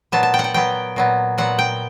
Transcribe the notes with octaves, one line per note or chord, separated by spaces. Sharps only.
A#2 F#3 B3 A5
A5
G5
F#5
G5
A#2 F#3 B3 G5
A#2 F#3 B3
A#2 F#3 B3 F#5
G5